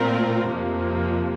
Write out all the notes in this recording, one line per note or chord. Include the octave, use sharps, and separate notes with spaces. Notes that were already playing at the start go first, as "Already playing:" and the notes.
Already playing: A#2 A3 C4 F4 A#4
F2 C3 F3 A#3